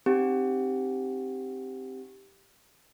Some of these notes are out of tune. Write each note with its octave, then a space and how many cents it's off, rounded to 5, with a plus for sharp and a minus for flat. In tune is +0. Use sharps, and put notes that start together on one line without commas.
C4 +0 D#4 -20 G4 +0